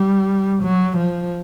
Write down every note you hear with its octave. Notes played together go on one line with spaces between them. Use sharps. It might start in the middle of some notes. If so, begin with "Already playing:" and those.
Already playing: G3
F#3
F3